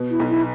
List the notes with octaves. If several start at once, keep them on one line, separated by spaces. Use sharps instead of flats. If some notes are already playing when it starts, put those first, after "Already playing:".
Already playing: B2
E4
B1
E4